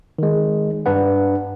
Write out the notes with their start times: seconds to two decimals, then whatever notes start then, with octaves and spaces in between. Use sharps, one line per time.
0.19 D#3 G#3
0.86 G2 D4 B4 F#5